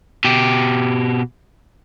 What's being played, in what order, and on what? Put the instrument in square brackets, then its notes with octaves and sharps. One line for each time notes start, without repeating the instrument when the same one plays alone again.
[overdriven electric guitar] B2 G4